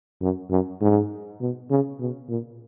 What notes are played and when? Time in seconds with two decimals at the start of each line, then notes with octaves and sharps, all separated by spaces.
0.21 F#2
0.50 F#2
0.81 G#2
1.41 B2
1.70 C#3
2.00 B2
2.29 A#2